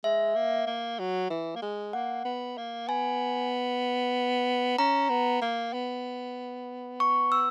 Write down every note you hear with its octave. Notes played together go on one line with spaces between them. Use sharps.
G#3 E5
A#3
A#3
F#3
E3
A#3
G#3
A#3 F#5
B3
A#3
B3 G#5
C#4 A#5
B3
A#3
B3
C#6
E6